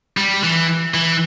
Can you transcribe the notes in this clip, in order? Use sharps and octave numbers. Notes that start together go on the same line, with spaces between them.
G3
E3
E3